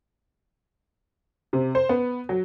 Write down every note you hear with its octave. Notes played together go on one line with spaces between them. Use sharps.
C3
C5
B3
F#3